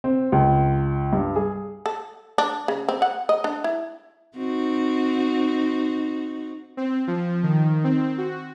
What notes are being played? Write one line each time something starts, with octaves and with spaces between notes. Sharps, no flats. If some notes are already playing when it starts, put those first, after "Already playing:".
C4
C#2
G2
G#4
A4
D4
C#3
C4
F#5
D#5
D4
E4
C4 D#4 F#4
C4
F3
D#3
C4
F#4